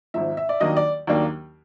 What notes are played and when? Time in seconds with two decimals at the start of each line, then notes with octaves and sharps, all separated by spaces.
0.14 G#1 G#2 F3 E5
0.37 E5
0.49 D5
0.60 D#2 D#3 F#3 A#3 D4 D#5
0.77 D5
1.07 D#2 D#3 F#3 A#3 D4